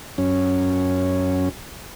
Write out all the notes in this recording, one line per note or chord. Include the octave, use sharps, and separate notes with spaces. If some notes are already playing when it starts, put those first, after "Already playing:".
F#2 C#4